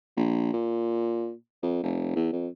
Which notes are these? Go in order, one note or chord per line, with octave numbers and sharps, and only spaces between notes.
A#1
A#2
F2
F1
E2
F2